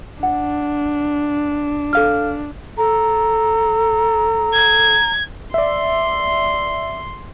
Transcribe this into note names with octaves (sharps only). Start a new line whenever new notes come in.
D4 F#5
A4 F5 F6
A4 A#5
G#6
D5 E5 C6